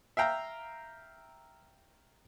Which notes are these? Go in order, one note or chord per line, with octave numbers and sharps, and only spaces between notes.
E5 F5 G5 A#5